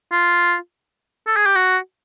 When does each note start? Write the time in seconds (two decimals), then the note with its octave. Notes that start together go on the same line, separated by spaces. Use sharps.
0.12 F4
1.27 A4
1.36 G#4
1.46 G4
1.56 F#4